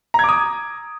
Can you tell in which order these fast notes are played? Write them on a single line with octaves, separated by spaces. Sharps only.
A#5 G#6 D6 D#6